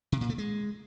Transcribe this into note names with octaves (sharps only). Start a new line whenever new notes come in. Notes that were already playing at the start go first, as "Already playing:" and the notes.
C3
A#2
A3
G#3